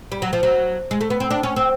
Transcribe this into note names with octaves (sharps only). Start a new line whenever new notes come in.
G3
F#3
F3
F#3
G#3
A3
B3
C4
D4
C#4
C4